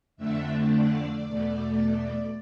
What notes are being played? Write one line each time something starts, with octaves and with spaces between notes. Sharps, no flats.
F2 D3 A3 D4 E5
D5
E2 B2 A3